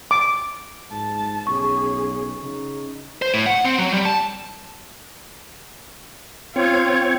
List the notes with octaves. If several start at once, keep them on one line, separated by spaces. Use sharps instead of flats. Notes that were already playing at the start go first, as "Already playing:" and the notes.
D6
G#2 A5
B1 C#4 G#4 C#6
C#3 D#4
C5
A2
F#5
C4
F#3
G3
A5
C4 F4 C#5